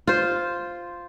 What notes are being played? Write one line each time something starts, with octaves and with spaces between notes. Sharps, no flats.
F4 C5